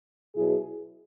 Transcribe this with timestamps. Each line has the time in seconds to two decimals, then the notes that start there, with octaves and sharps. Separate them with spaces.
0.34 B2 F#3 E4 G#4